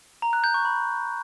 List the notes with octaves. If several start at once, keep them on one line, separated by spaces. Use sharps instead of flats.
A#5
F#6
G6
C#6
B5